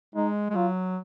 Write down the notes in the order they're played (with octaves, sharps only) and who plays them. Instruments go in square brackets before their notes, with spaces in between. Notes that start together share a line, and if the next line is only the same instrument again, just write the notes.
[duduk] G#3 [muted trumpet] D#4
[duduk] G#3
[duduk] F#3 [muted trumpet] F4